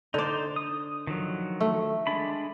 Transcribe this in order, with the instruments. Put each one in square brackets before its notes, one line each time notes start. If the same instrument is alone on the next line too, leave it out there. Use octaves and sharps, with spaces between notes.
[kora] D3 D5 [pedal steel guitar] D#4 C5
[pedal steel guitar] D#6
D#3 F3 F#3
[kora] A3
[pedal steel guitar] G#3 D4 B5